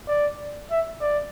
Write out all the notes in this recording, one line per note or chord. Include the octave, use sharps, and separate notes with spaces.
D5
E5
D5